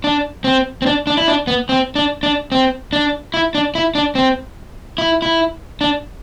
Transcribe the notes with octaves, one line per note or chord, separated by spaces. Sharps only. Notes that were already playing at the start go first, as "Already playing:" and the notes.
D4
C4
C4
D4
D4
E4
D4
B3
C4
D4
D4
C4
D4
E4
D4
E4
D4
C4
E4
E4
D4